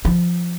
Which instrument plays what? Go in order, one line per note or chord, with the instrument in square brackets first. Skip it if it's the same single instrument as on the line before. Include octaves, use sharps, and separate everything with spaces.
[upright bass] F3